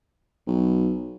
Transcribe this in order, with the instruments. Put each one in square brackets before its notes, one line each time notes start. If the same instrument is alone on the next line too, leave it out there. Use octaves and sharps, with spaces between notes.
[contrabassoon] B1